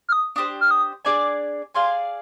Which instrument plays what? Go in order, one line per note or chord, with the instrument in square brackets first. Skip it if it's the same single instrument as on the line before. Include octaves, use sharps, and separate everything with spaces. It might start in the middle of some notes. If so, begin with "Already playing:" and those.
[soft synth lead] F6
D#6
[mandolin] D4 G4 C5 [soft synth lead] D#6
[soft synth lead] F6
D#6
[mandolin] D4 G#4 D5 G#5 [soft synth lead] D6
[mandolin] G#4 D5 F5 G#5 [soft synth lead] C6